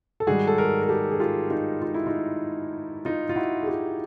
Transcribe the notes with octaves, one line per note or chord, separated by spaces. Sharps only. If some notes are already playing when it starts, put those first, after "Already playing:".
A4
G#2 D#3 G3 F#4 G#4
A4
G#4 A#4
A#4
G4 A4
G#4
F4 G4
D#4 F4
F4
E4
D#4 F4
D#4 F4
F4
E4 F#4
G#4
F4 G4